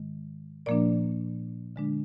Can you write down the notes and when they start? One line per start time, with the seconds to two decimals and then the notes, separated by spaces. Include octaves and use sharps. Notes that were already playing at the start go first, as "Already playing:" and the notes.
Already playing: G#2 D#3 G#3
0.66 A#2 F3 A#3 D4 D5
1.76 D3 G#3 D4